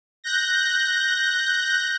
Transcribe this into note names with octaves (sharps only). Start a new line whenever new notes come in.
F#6 G6 A#6